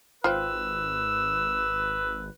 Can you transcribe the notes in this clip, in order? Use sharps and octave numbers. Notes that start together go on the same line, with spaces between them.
G#1 F4 B4 C5 G5 E6